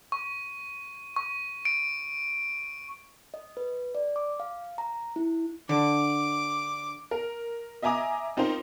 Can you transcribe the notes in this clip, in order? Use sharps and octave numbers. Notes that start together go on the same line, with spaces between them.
C#6
C#6
D7
D#5
B4
D5
D6
F5
A#5
E4
D3 D6
A#4
D#5 E5 G#5 A#5 D6 D#6
C4 D#4 F4 A#4 C5